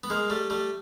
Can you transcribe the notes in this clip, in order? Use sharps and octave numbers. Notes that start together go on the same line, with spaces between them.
B3
G#3 A#3
G3 A3
G3 A3